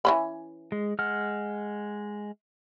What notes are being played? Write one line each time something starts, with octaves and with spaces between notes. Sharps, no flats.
E3 C#4 B5
G#3
G#3 F#5 F6